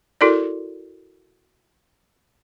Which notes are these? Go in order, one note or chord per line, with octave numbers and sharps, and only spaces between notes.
E4 F#4 A4 A#4 D5